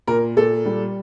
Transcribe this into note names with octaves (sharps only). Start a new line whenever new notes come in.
A#2 A#4
A#2 A4
G3